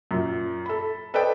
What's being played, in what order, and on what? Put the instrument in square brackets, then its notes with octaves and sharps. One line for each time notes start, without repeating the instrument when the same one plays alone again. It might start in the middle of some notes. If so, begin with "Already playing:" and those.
[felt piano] F#2 A#2
A4 B5
A4 B4 C5 D5 D#5 G5